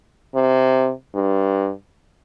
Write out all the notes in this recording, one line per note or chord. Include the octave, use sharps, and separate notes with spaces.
C3
G2